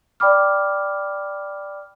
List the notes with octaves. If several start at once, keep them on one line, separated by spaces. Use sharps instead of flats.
D5 G5 B5 D6 F6